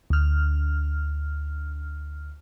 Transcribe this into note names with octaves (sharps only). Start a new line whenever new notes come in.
D2 F6